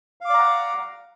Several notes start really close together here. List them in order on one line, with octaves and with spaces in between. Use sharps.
F5 D6 D5 A#5 F#5